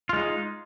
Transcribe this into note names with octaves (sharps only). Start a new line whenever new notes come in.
G#3 D#4 F4